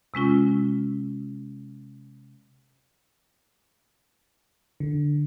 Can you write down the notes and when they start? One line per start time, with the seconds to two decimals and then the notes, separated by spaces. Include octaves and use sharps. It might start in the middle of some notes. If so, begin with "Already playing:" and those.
0.14 C3 G#3 C#4 F4
4.80 D3